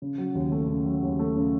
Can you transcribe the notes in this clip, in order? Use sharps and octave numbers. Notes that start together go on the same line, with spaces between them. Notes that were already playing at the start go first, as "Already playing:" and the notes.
C#3
F#3
D#2
A3
C#3
F#3
D#2
A3
C#3